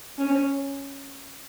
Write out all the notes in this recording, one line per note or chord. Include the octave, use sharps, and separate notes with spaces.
C#4